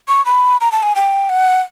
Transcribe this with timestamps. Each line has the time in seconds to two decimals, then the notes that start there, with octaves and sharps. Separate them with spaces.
0.08 C#6
0.25 B5
0.61 A#5
0.72 A5
0.83 G#5
0.95 G5
1.29 F#5